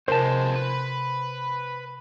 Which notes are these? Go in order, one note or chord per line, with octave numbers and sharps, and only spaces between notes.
F2 C3 G#3 A#4 C5 A5
B4